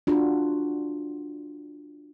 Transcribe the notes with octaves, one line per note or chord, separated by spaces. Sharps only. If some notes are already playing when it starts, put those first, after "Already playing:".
D4 F4 F#4